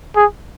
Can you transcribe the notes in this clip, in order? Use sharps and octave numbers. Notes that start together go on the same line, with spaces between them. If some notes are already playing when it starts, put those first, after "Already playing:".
G#4